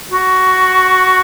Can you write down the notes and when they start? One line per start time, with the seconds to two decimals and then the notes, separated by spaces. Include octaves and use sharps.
0.11 F#4